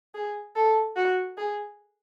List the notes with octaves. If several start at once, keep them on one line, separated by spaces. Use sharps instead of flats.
G#4
A4
F#4
G#4